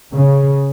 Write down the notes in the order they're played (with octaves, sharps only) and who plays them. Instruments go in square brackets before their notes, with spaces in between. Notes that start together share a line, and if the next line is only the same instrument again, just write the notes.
[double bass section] C#3